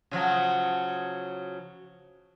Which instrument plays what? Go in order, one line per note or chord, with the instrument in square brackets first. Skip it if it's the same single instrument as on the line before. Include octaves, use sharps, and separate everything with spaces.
[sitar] C#3 F3 F#3